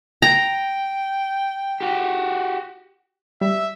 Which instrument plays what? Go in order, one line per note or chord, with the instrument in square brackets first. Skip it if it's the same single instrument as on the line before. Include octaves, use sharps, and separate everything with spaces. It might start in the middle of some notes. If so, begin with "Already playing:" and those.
[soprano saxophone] G5 [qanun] A#5
[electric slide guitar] F#4 G4
[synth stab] G3 [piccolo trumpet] E5